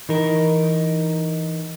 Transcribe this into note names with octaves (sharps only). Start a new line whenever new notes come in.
E3 D#4 A#4